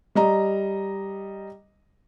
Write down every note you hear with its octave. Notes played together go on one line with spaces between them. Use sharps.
G3 D#5 A#5